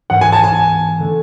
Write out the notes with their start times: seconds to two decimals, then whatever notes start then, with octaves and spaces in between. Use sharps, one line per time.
0.10 G#2 E3 B3 F#5
0.21 G#5
0.32 A5
0.44 G#5
0.99 D3 A3 D4